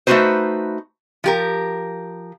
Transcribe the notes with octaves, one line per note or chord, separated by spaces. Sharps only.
A3 D#4 E4 F#4 B4 C5
F3 G4 A#4